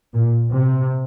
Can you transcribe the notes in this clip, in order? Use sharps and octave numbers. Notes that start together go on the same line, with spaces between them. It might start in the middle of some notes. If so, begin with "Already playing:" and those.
A#2
C3